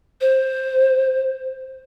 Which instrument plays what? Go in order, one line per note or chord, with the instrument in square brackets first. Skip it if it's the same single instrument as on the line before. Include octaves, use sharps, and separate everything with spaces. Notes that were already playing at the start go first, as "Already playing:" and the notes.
[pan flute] C5